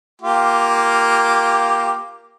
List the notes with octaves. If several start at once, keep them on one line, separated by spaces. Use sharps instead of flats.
A#3 F4 G4